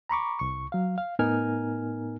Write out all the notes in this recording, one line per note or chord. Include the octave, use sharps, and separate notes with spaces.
A#5 B5 C#6 D6
C2 C#6
F#3 F5
F5
A2 B3 D#4 A#4 G#5 F6